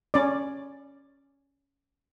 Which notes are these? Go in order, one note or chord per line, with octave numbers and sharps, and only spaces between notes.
C#4 D5